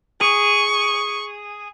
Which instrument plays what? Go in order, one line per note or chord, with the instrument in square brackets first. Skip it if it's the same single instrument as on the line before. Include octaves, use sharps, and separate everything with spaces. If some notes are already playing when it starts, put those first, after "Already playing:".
[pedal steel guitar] G#4 [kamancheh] C#6